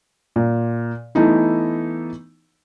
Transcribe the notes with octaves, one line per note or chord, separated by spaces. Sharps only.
A#2
E3 A3 B3 D#4 E4